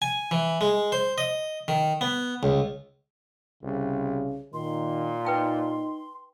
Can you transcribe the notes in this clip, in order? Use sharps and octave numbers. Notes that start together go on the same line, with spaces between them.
G#5
E3
G#3
C5
D#5
D#3
B3
C#2
C2 C#3
A#2 D#3 C6
D#4 B4 G5 A5